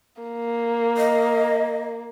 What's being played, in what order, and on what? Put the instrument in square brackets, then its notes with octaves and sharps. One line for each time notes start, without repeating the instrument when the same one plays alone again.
[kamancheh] A#3
[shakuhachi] D#5